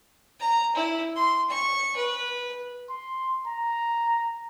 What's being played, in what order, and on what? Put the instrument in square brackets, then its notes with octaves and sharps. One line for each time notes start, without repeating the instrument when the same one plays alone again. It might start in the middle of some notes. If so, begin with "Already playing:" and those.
[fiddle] A#5
E4
C6
C#6
B4
[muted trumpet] C6
A#5